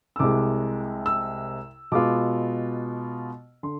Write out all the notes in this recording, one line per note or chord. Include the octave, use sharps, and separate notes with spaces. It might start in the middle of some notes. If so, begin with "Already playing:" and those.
E6
C2 C3 G#3 D6
E6
B2 G#3 B3 F4 D6
D3 C6